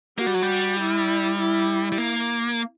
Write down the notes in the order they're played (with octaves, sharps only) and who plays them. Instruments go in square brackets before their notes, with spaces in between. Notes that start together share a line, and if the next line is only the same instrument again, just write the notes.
[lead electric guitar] A#3 [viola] F#4
[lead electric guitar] G3
F#3
G3
[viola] E4
E4
[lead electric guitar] G3
A#3